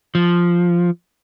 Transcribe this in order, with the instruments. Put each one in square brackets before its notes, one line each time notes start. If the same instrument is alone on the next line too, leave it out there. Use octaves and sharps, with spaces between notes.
[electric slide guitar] F3